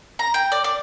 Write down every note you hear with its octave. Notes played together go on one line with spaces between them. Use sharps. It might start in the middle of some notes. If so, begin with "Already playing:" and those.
A#5
G5
D5
D5